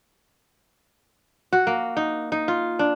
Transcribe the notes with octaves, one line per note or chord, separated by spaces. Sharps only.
F#4
A#3
D#4
D#4
F4
D4